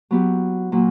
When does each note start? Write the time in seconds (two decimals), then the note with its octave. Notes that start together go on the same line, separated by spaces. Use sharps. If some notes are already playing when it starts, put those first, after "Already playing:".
0.11 F#3 B3 E4 G4
0.72 A#2 F#3 A#3